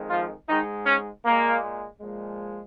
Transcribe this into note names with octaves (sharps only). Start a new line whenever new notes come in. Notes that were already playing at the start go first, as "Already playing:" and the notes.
Already playing: F2 D#3 G#3
F3 F4
G#2 D#3 G#3 D#4
C#4
A#2 G#3 A#3
A#2 F3 G#3